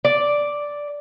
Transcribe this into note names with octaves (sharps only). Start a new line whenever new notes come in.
D5